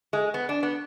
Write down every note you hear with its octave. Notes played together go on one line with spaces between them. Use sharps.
G#3
B3
D4
B3